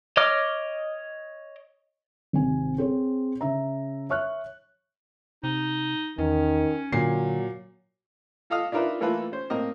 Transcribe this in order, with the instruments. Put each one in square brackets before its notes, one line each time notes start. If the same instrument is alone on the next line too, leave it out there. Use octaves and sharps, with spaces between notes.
[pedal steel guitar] C#5 D#5 D6 F6
[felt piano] G#1 C3 G#5
C4 G#4 C#5
C#3 E5 A#5
C#5 E5 C#6 F6 F#6
[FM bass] C3 [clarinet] D#4
[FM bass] E2 [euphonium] D#3 [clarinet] C#4
[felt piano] A#2 C7 [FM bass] D3 [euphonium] F#3
[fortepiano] F4 A4 D#5 F5 D#6 F6
D4 D#4 F4 A#4 B4 E5
E3 A3 A#3 F4 A4 B4
C#4 C5
A2 A#3 C4 A#4 D#5